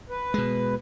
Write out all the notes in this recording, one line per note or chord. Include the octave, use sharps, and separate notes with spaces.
B4
B2 G#3